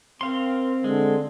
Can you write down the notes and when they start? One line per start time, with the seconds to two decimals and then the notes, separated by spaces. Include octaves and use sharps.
0.21 C4 A#4 F5 C6
0.84 D3 G#3